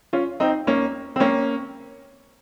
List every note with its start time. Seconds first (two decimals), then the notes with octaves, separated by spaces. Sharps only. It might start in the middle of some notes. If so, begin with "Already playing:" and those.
0.13 C#4 F4
0.40 C4 D#4
0.67 A#3 C#4
1.16 C4
1.20 A#3 C#4